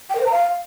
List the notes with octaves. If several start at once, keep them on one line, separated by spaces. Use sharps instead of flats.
G5
A#4
C5
A#5
F5